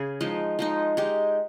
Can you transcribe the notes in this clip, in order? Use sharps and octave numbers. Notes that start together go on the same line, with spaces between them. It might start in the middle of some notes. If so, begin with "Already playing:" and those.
Already playing: C#3 G#4
F3 G#3 D#4
F3 G#3 D#4
G#3 D#4 G4